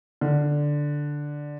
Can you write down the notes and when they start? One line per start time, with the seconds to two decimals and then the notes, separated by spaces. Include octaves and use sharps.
0.21 D3